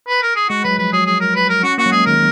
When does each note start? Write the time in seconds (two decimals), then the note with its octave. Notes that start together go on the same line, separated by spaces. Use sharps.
0.08 B4
0.22 A#4
0.36 G#4
0.49 G#3 F#4
0.64 F#3 B4
0.78 F3 B4
0.93 F#3 G#4
1.06 G#4
1.20 A#4
1.35 B4
1.49 A#4
1.63 C#4 F#4
1.78 A#3 F#4
1.86 F#3
1.92 G#3 G#4
2.06 D#3 A#4